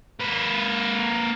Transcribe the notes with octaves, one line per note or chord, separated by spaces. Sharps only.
A#3 B4